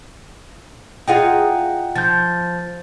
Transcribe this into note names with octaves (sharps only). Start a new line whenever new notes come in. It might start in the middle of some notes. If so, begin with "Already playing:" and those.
D#4 F4 G#4 F#5 G5
F3 G6 A6